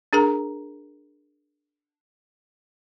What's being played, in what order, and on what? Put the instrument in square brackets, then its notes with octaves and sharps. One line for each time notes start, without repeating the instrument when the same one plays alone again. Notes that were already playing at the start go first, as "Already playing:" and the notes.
[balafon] D4 G#4 A#4 A#5